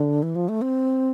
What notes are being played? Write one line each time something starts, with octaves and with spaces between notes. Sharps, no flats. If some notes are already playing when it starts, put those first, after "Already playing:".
Already playing: D3
E3
F3
A3
C4